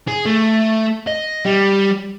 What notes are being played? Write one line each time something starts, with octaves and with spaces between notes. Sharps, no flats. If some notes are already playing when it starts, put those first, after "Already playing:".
G#4
A3
D#5
G3